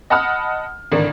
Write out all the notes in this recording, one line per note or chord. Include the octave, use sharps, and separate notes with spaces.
D#5 F#5 A5 B5 D#6 F6
G#1 A2 D3 D4 A#4